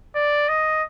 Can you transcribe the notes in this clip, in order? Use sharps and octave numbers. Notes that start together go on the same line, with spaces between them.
D5
D#5